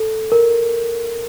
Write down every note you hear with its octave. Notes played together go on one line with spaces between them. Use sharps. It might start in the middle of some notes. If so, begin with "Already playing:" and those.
Already playing: A4
A#4